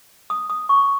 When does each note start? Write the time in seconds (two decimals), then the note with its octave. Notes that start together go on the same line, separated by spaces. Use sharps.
0.30 D#6
0.50 D#6
0.69 C#6